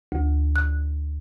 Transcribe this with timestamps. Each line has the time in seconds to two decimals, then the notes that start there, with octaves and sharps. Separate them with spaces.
0.12 D2
0.56 F#6